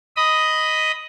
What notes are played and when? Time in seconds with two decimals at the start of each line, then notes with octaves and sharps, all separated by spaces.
0.17 D#5 B5 D#6